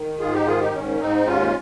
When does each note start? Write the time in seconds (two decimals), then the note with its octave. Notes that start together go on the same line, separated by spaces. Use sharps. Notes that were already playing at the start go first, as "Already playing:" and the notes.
Already playing: D#3
0.19 G#2 F4 G#4
0.33 D#4 G4
0.46 D#3 F4 G#4
0.60 D#4 G4
0.73 G#2 C#4
1.00 G#2 C4 D#4
1.26 D#2 C#4 F4